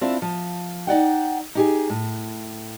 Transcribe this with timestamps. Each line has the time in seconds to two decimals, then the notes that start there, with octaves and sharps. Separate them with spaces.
0.01 C4 D4 E4 F4
0.22 F3
0.87 D#4 D5 F#5 G5
1.55 D#4 G4 G#4
1.90 A2